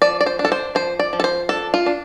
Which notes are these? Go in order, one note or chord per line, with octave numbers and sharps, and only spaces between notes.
F3 D5
D5
C5
D4
A4
C5
F3 C5
D5
F3
A4
C5
D4 A4
F4
D4